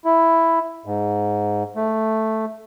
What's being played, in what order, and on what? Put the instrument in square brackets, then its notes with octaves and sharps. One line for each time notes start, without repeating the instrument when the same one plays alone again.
[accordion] E4
G#2
A3